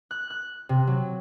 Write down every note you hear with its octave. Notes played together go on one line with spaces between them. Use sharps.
F#6
F#6
C3
F#3